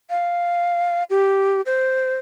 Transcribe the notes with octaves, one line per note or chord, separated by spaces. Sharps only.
F5
G4
C5